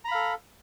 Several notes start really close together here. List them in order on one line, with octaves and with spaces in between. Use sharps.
A#5 B5 F5 A4